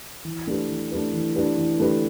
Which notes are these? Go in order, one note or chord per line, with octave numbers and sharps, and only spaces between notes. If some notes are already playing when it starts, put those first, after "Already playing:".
E3
A3 D4 G4 B4
E3
A3 D4 G4 B4
E3
A3 D4 G4 B4
E3
A3 D4 G4 B4